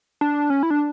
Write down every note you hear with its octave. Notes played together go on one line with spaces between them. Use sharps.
D4
C#4
E4
D4